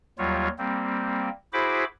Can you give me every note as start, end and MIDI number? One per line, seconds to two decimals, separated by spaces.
0.18 0.48 39
0.18 0.48 54
0.18 0.48 55
0.18 0.48 65
0.18 0.48 73
0.58 1.29 55
0.58 1.29 58
0.58 1.29 60
1.53 1.84 64
1.53 1.84 66
1.53 1.84 68
1.53 1.84 72
1.53 1.84 83
1.53 1.84 86